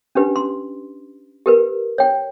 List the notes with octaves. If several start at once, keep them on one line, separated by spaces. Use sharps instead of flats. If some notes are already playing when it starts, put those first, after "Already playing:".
C#4 D4 G4 B4
C6
G4 A#4 B4
C#5 G5